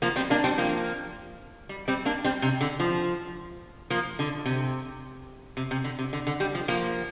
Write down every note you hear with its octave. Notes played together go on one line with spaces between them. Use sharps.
F3 A#3
G3 C4
A#3 D4
G3 C4
F3 A#3
G3
G3 C4
A#3 D4
G3 C4
C3
D3
F3
F3 A#3
D3
C3
C3
C3
D3
C3
D3
D3
G3
F3
F3 A#3